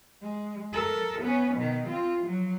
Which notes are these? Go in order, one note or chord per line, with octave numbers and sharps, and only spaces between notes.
G#3
A4 A#4
B3 C#4
B2 D#3
C4 F4
F3 F#3